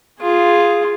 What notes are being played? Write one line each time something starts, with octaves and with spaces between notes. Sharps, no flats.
F4 G#4